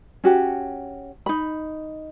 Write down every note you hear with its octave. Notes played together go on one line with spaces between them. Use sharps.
C#4 F#4 G4
D#4 B5